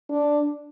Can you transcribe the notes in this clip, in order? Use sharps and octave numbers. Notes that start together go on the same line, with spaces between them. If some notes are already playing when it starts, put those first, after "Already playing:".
D4